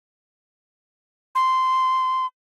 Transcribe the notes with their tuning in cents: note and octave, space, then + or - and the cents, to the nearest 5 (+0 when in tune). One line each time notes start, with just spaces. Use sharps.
C6 -15